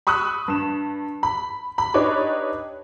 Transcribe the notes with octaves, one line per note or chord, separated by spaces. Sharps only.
B5 C#6 D#6 E6 F#6
G2 E7
B5
B5
D4 D#4 G4 B4 C#5 D5